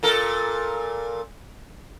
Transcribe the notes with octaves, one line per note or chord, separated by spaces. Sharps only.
A#2 A4 A#4